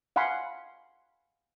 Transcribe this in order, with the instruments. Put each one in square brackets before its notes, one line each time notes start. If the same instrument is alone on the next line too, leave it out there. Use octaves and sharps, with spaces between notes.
[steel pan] F5 F#5 G#5 B5 C6